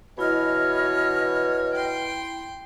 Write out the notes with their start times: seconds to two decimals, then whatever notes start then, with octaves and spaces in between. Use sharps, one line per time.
0.18 B2 E3 E4 C#5 D#5 B5 F6
1.75 G5 C6